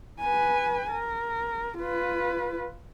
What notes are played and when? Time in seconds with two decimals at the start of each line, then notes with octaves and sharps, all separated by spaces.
0.20 B4 G#5
0.91 A#4
1.78 F4 B4